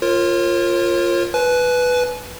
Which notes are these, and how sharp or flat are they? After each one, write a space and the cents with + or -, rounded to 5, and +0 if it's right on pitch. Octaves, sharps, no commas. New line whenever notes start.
F4 +0 A#4 +0 C#5 -40
B4 +0 G#5 +45